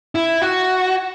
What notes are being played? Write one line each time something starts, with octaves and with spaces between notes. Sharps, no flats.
E4
F#4